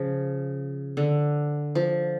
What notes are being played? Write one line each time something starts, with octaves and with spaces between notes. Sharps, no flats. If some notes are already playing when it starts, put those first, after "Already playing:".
Already playing: C#3 F3
D3
F3